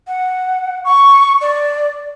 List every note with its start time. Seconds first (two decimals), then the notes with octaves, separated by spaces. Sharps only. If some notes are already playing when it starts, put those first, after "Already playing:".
0.07 F#5
0.85 C#6
1.41 D5